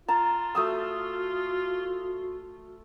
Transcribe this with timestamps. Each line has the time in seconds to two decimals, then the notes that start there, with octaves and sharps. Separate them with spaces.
0.08 F4 A5 A#5
0.55 A3 F#4 D#6 E6